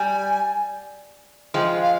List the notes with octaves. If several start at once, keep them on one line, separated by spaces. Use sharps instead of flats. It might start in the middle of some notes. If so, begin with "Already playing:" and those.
Already playing: G3 G#5
F3 G#3 G5
F5